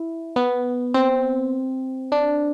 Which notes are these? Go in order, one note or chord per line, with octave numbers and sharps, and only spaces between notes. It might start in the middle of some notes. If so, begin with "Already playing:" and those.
Already playing: E4
B3
C4
D4